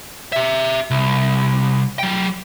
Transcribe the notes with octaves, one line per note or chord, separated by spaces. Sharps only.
G4 E5
C2
F#3 G5